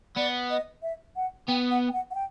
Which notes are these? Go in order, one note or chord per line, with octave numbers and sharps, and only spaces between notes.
B3 D5
D#5
E5
F#5
B3 G5
F#5
G5
F#5
F#5
G5